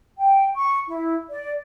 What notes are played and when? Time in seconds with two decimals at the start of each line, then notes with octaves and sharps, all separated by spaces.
0.18 G5
0.54 C#6
0.88 E4
1.30 D5